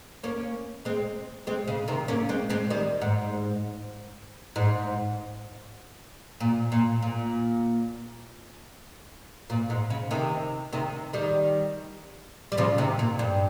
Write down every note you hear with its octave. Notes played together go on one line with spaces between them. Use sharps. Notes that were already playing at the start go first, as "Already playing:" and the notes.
A#3 C#4
G#3 C4
G#3 C4
C#3
C3 D#3
A#3 C#4
G#3 C4
G#3 C4
D#3 G3
G#2
G#2
A#2
A#2
A#2
A#2
G#2
C#3
C3 D#3
C3 D#3
D#3 G3
G3
C#3 F3
C3 D#3
A#2
G2